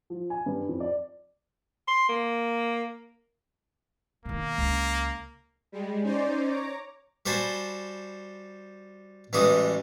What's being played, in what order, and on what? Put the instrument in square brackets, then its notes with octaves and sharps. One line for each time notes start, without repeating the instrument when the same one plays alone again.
[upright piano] F3
G#5
G2
F2
D5
[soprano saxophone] C6
A#3
[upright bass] B2 D#3 [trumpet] A#3
[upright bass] C#2
[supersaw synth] G3 G#3
C#4 D#4 C5 D5
C#5 A#5 D6
[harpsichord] G3 F#4 C5 G#5 A5 B5
A1 E3 G3 G#3 F#4 D#6